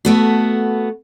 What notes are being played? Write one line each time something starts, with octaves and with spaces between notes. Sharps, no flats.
A3 B3 F#4